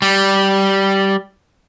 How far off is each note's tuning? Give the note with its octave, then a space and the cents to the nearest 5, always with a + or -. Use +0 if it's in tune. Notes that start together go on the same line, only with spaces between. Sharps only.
G3 -10